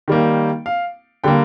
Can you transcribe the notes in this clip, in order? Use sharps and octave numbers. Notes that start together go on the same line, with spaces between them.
D#3 G3 A#3
F5
D3 G3 A#3 G5